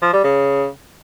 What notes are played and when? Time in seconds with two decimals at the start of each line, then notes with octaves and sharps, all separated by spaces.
0.02 F3
0.13 G3
0.24 C#3